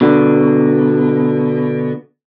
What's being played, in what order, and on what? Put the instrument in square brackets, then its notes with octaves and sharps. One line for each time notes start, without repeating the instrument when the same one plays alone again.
[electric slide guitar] B2 D3